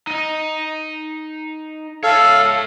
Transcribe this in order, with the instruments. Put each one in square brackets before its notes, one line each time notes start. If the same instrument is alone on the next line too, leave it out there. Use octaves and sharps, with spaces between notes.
[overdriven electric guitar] D#4 D#5
[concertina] A4 F5 [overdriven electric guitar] C#5 E5